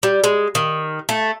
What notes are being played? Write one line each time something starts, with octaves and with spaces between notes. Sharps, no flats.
G3
G#3
D#3
A3